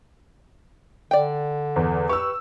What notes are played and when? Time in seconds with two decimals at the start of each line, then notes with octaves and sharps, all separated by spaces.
1.11 D3 D5 G5
1.76 E2
2.09 G4 B4 C#6 E6